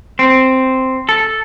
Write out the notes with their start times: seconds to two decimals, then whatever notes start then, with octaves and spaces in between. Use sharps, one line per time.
0.19 C4
1.09 A4